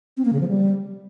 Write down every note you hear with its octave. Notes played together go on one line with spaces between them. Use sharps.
C4
A#3
C#3
F3
G3